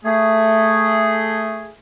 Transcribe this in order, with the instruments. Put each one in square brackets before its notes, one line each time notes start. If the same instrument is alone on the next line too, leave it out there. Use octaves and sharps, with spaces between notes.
[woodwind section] A3 G#4